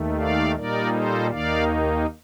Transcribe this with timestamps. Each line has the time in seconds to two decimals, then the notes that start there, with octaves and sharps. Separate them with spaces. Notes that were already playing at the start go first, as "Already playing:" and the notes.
Already playing: D#2 D#3 A3
0.18 D5 F5
0.55 A#2 G3 A#3 D#4 A#4 D5
0.92 A4 C5
1.30 D#2 D#3 A#3 D#4 D5 F5